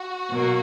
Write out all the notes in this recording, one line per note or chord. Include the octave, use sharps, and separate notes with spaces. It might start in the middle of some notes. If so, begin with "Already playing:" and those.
Already playing: F#4
B2 F#3 A#3